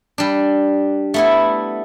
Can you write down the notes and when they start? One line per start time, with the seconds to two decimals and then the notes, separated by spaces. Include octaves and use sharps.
0.18 G3 D4
1.14 A3 B3 E4